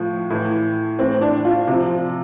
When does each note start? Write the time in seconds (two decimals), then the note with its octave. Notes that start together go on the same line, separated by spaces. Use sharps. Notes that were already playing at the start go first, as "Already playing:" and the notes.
Already playing: A2 F3
0.30 A2 E3
0.99 A2 E3 C4
1.21 D4
1.45 F4
1.67 C3 F4
1.72 F3